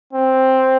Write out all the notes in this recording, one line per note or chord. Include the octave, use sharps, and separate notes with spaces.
C4